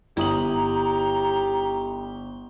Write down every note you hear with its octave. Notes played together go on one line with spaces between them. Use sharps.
G1 E4 G4 A#5 D#6 F#7